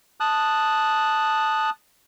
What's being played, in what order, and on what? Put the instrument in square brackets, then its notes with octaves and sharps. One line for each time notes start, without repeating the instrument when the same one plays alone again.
[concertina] A5 D#6 F#6